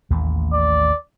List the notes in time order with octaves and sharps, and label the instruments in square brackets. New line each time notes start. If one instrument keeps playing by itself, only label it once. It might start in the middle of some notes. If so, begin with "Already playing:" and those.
[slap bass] A1 D#2 A3
[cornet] D5